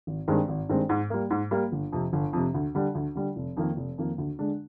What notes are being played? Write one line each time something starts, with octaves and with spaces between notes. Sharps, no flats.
G#1
G2 D#3 G#3 C4
G#1
G2 D#3 G#3 C4
G#2
G3 A#3
G#2
G3 A#3
G1
F2 C3
G1
F2 C3
D2
D3 G3
D2
D3 G3
F1
F2 D#3 A#3
F1
F2 D#3 A#3
D2
D3 G#3 D4